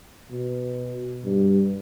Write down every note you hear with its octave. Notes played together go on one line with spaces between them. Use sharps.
B2
G2